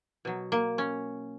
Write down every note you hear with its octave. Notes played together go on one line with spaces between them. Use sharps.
B2 F#3
A#3
C#4